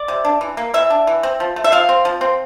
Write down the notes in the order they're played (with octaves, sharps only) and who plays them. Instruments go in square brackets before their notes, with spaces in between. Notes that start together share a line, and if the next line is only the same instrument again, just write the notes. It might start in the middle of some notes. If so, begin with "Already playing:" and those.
Already playing: [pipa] D5
C3
D4
E3
A#3
E3 E5
D4
E3
C4
F3
A3
E5
F3 F5
C4
F3
C4